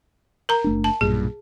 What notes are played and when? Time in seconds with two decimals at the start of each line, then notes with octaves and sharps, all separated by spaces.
0.49 A#4 A#5
0.64 F#1 A3 D4
0.84 A5
1.01 B1 G2 A#2 G#4